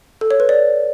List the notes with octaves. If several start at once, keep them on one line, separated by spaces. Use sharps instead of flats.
A4
C#5
B4
D5